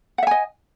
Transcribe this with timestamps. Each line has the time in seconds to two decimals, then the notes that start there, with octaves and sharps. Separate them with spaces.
0.18 F#5
0.23 E5
0.27 G#5
0.31 D#5